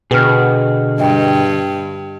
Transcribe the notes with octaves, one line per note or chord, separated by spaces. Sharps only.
B2 D3 G#4 B4 G5 F6
G2 D#5 G5